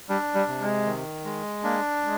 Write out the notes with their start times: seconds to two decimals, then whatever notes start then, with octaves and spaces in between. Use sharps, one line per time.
0.09 G3 D4
0.35 G3
0.48 C3
0.60 G#3
0.86 D#3
1.25 G#3
1.63 A#3 D4
2.02 G#3